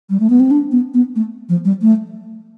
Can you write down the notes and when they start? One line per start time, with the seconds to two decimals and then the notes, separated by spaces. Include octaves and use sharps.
0.10 G3
0.20 A3
0.30 B3
0.40 C4
0.51 D4
0.71 B3
0.94 B3
1.16 A3
1.49 F3
1.65 G3
1.82 A3